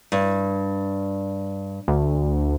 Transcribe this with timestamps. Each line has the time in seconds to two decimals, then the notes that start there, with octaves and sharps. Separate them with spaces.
0.12 G2
1.88 D2